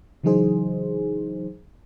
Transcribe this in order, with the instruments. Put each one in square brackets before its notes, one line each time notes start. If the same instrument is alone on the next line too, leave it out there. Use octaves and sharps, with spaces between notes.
[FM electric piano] C#3 E3 F#3 D#4 G#4 C5